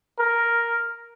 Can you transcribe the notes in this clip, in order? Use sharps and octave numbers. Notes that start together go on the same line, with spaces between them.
A#4